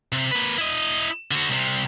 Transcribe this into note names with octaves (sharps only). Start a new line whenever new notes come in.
C3
A#3 B4
E4 D#5
D3 F#4
C2 C3